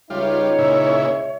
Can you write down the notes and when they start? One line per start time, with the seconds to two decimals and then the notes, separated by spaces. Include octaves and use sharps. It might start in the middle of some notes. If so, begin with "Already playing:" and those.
0.10 C#2 G3 D#4 F4 C#5 E5
0.59 A#2 C#3 E4